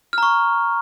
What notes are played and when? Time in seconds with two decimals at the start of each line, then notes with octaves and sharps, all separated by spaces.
0.13 F6
0.18 A#5
0.23 C#6